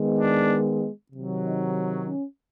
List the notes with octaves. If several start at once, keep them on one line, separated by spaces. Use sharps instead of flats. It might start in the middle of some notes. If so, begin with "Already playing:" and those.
Already playing: D#3 G#3 B3
D4
C3 D#3 F#3
D#4
C#4